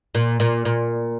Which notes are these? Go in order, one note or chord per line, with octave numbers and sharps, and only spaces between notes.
A#2
A#2
A#2